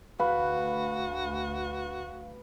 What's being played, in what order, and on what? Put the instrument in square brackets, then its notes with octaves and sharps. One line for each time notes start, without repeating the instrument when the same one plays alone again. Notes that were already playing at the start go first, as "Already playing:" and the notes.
[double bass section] D2 [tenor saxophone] F#4 [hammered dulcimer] B4 [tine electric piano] F5